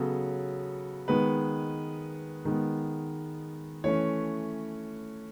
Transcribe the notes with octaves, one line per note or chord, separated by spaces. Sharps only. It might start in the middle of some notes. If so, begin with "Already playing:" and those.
Already playing: C#3 F#3 B3 A4
D#3 G#3 B3 B4
D#3 G#3 B3
E3 A3 C#4 C#5